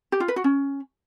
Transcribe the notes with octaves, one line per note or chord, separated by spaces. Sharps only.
G4
F4
B4
F#4
C#4